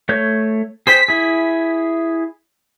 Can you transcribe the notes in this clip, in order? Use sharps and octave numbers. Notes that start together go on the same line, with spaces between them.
A3 C#5 G6
G#4 C5 G5 B6
E4 G#4